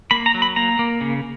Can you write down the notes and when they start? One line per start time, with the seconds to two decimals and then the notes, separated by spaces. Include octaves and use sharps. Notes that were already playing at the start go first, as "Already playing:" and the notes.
0.11 A#3 B5
0.26 A#5
0.34 F#3
0.42 B5
0.56 A#3 A#5
0.79 A#3
1.01 C#3